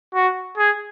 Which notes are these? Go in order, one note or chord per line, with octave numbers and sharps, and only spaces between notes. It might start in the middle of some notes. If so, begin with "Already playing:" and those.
F#4
G#4